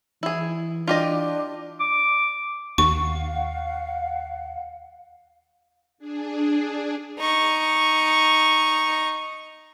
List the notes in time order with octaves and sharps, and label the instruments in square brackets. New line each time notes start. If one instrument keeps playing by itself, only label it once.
[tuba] E3 [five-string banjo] E4 G#4
[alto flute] D4 [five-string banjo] F4 G4 D#5
[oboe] D6
[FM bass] D#2 [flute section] F5 F#5 [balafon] C#6
[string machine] D4 G#4
[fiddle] D#4 C#6